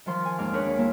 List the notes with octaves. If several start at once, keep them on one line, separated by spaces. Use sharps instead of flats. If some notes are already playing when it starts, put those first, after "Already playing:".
D#3 F3 C6
G#5
D#2 G#2 D#4 F5 D6
D4 G#4 A#4 B4 C#5
D#2
A3 A#3 E4